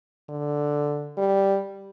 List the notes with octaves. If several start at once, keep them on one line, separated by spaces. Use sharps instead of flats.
D3
G3